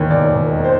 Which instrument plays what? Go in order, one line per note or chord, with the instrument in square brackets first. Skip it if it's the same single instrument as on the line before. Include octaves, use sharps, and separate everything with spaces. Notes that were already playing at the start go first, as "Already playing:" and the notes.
Already playing: [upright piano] E1 D#2 D#3 C#5
E1 D5
E1
D#3
C5